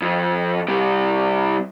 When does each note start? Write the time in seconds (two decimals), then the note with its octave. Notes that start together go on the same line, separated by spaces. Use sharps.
0.02 F2
0.68 C3 G3